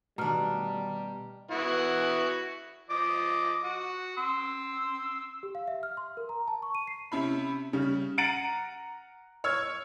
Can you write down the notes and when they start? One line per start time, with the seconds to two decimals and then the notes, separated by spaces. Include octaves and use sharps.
0.18 B2 D#3 G3 A3 D4 A#5 F6
1.51 B3 E4 F#4
2.90 F3 D#5 D6
3.64 F#4
4.18 C6 E6
5.43 G4
5.55 F5
5.68 E5
5.83 F6
5.97 C6
6.17 A#4
6.29 A#5
6.48 A5
6.62 C#6
6.75 D#7
6.87 C7
7.12 C3 C#4 E4 B5
7.73 C#3 G3 C#4
8.18 F#5 A#5 A6 D7 D#7 F#7
9.44 C#5 E6 F6 G#6